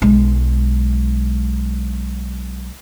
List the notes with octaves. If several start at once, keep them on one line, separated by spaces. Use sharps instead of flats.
B1 G#3